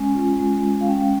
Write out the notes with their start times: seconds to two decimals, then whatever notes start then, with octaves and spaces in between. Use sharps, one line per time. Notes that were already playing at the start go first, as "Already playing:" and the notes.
Already playing: G#3 C#4 G#5
0.15 F4
0.39 G#3
0.63 G#3
0.81 F5
0.88 C#4 G5